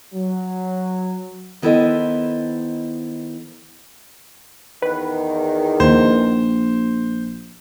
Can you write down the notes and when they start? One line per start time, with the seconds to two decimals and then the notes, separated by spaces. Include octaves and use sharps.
0.15 F#3
1.62 D#3 B3 E4 A4 C5 D#5
4.82 E2 D#3 B4
5.80 A#1 D#2 C5